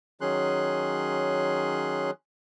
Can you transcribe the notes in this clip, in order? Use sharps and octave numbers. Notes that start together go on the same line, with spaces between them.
D#3 F#3 C#4 G#4 C6 F#6